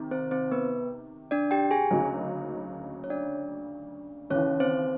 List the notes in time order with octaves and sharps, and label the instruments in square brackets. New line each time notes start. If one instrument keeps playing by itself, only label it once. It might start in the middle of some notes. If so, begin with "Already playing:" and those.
Already playing: [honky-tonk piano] C3 D#3
[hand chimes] C4 C5
C4 C5
B3 B4
D4 D5
G4 G5
G#4 G#5
[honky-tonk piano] D2 C#3 F#3 A#3 D#4
[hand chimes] C#5
D4 D5
[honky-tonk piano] D#2 C#3 E3 [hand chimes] C#4 C#5
[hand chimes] C4 C5